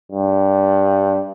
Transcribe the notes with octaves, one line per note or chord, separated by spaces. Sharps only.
G2